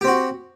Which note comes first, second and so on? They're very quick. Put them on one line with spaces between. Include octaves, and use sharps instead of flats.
G4 C4 F#4